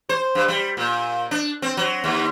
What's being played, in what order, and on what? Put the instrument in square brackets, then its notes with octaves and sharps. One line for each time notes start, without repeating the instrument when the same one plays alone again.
[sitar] C5
G2
G3
A#2
D4
C4
F#3
D#2